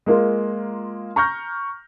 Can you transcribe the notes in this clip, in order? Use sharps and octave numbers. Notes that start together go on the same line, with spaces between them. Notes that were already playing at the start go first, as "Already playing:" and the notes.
G#3 A#3 F4 A#4
A#5 C#6 F6 G6 A#6